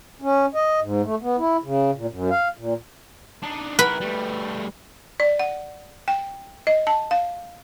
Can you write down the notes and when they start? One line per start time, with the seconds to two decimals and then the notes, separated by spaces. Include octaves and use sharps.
0.22 C#4
0.55 D#5
0.81 G#2
1.03 A3
1.22 B3
1.38 E4
1.64 C#3
1.95 A#2
2.11 F#2
2.30 F5
2.58 A#2
3.42 D4 D#4
3.79 E4 A#4 B4
4.00 G3 A3
5.20 D5
5.39 F#5
6.08 G5
6.67 D#5
6.87 A5
7.11 F5